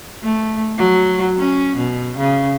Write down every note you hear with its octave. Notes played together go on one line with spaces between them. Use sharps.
A3
F#3
C#4
B2
C#3